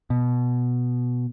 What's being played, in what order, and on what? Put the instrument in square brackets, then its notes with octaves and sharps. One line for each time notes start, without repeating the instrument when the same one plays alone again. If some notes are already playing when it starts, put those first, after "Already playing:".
[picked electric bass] B2